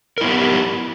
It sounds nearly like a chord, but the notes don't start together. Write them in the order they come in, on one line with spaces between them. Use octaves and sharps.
A#4 E4 B3 G4